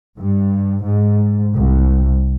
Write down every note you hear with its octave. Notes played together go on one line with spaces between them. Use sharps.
G2
G#2
C2